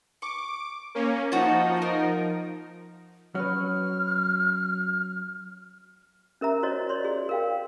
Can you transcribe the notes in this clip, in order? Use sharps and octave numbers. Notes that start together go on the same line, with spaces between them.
C#6 D6
A#3 C#4
F3 D#4 F#4 A5
A#4
F#3 C#4 B4 F6
C#4 A#4 E5 A#5
F#4 C5 C#5 D#5
C#5 D5 C6
F#4 G#4
A#4 F5 G5